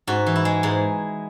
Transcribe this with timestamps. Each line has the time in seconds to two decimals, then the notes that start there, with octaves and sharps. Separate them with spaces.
0.07 G#2 F#4
0.26 E3
0.36 E4
0.45 G#3
0.63 G#2 G#4